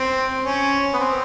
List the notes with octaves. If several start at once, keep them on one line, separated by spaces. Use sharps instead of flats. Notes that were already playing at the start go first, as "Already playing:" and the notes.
Already playing: C4
C#4
B3
C4